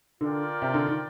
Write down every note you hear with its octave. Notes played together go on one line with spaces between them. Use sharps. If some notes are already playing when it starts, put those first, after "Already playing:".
D3 F4 A#4 D5 G5
C3
D3
D#3